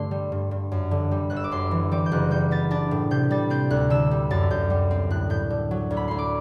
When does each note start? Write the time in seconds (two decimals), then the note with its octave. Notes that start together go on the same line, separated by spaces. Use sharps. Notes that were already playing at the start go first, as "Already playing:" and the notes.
Already playing: G2 D3 A3 C6
0.11 G3
0.32 G2
0.51 G2
0.72 F#2
0.91 D3
1.11 G3
1.30 G1 F#6
1.36 E6
1.44 D6
1.52 F#2 C6
1.71 E3
1.92 G3 D6
2.06 G6
2.12 F#1 F#6
2.31 G3 G6
2.51 B3 A6
2.71 D4 A6
2.91 A2
3.11 C3 G6
3.31 G3 A6
3.50 C4 G6
3.70 D2 F#6
3.90 D3 E6
4.11 G3
4.31 F#2 A6
4.51 F#2 G6
4.70 G3
4.91 C4
5.10 A2 F#6
5.30 A2 G6
5.50 D3
5.71 F#3
5.91 D2
5.97 B5
6.08 D2 C6
6.19 D6